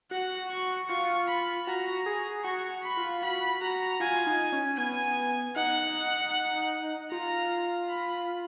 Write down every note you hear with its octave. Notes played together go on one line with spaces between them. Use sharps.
F#4 F#5
C#6
F4 C#6
B5
F#4 A#5
G#4
F#4 C#6
B5
F4
F#4 B5
F#4 A#5
F4 G#5
D#4
C#4
B3 G#5
D#4 F#5
F4 A#5
B5